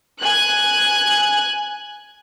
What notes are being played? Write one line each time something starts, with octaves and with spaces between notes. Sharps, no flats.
G#5 F#6